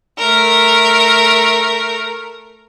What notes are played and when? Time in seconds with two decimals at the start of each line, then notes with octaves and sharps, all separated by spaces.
0.18 A3 A#4